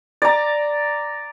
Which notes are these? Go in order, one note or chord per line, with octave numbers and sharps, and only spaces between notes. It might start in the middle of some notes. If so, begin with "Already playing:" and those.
D5 A#5